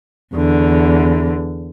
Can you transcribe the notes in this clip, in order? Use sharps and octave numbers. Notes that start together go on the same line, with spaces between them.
E2 D3